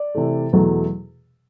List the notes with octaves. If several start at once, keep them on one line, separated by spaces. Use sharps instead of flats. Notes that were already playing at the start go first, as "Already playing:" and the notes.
Already playing: D5
C3 E3 A3
E2 B2 F#3 A3